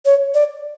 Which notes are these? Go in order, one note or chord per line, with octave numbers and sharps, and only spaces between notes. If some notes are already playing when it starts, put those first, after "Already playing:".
C#5
D5